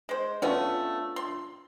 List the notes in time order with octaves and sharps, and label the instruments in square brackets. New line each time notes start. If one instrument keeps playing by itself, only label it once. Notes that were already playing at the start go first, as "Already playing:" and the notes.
[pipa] G#3 C5
[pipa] A3 B3 C#4 [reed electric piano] D4 F4
[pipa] C6